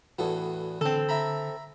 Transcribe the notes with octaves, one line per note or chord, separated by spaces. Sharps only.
E2 A2 B3 F#4 A4
D3 C4 A4
E5 A#5 B5